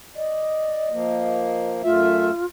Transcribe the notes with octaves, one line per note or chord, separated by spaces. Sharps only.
D5 D#5
F3 A#3
F#2 A3 F4 E5